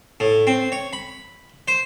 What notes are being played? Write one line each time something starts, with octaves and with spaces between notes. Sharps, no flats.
A2
C4
C#5
B5
C5